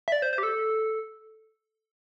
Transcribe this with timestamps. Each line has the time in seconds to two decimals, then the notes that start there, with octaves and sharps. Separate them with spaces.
0.08 E5
0.12 D5
0.22 C5
0.33 C5
0.38 G4
0.43 A4